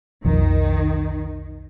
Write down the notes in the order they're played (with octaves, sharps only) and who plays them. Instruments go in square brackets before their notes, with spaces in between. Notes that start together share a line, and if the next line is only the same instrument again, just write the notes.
[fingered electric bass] B1 F2 [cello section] D#3